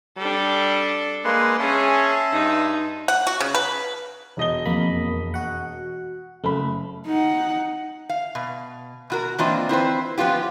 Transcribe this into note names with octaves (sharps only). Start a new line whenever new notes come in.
G3 D4 A4
G#3 A#3 B4 C6
C#4 G#4 E5 G#5 A5 C6
G2 D#4
F#5
F#4
C#3
B4
E1 D#5 G7
F2 A#3 B5
F#4 F#5
F#1 A3 B5
D#4 F#5
F5
B2
B2 F#4 A#4
E3 A#3 C4 D4 F4 D#5
C4 E4 B4 C5
F3 B3 C#4 F4 G4